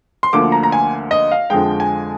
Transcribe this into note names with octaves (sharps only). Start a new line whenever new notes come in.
C6
D2 D3 F3 A#3 D6
A#5
A#5
G#5
D#5
F5
F2 D3 F3 G#3 G5
G#5